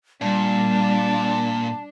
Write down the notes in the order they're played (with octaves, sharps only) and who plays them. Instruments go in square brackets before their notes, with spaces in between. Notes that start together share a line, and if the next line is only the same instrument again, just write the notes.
[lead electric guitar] A#2 [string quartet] G3 [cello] D4 [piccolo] A5